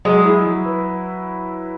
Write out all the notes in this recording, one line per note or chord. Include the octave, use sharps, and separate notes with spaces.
F#3 G#3
E4
F#3
B4